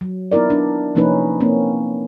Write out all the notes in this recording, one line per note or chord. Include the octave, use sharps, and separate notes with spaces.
F#3
B3 D#4 E4 A#4 D5
D4
C3 F3 A#3 C#4 D#4 B4
A#3 C4 C#4